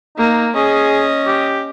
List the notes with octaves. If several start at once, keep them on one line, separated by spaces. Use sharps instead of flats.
A#3 D#4
C#4 G#4 D#5
G4